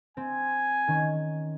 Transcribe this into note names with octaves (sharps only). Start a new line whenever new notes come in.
C4 G#5
D#3 C#4